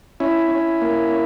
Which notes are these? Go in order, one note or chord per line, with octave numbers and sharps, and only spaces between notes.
C#4 E4
C#4
A#3